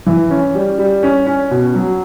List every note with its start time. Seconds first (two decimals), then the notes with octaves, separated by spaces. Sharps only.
0.07 E3
0.30 C#4
0.55 G3
0.78 G3
1.03 C#4
1.27 C#4
1.51 B2
1.75 F#3